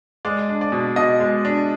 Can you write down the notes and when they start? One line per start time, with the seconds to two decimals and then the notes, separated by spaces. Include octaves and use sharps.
0.25 G#3 D5
0.49 D4
0.61 D5
0.72 B2
0.96 B2 D#5
1.20 G#3
1.45 D4